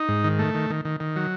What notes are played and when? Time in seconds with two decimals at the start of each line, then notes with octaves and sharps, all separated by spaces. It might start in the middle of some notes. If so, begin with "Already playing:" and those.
Already playing: D#4
0.09 G#2
0.24 D#3
0.39 A3
0.54 D#3
0.70 D#3
0.85 D#3
1.00 D#3
1.16 F#3